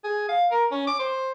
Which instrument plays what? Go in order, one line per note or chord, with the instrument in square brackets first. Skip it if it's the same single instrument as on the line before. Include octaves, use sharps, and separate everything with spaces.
[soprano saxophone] G#4
F5
A#4
C#4
D6
C5